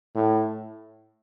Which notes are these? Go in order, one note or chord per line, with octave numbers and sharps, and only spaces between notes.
A2